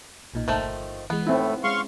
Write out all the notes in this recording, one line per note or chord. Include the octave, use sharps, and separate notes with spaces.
B1 A#2 D#4
G1 D#3 F3 A3
E3 G#3 B3
A2 A3 C4 D#4 E4
G#3 C#4 F5 C6 C#6